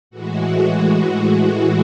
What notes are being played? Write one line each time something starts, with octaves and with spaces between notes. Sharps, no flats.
A2 E3 G#3 F#4